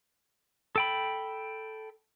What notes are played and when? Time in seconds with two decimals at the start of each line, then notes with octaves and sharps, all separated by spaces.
0.76 A4 G5 B5